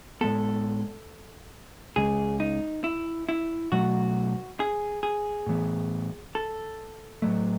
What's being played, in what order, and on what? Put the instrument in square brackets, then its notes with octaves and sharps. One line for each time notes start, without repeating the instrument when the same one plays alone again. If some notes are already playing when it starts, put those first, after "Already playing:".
[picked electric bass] A2 G#3 B3 [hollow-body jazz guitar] A4
[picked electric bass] C#2 C#3 G#3 [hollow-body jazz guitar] G#4
[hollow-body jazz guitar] D#4
E4
E4
[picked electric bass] B2 F#3 A3 [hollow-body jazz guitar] F#4
[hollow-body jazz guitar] G#4
G#4
[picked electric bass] A2 E3 B3
[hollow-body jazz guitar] A4
[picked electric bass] A2 F#3 A3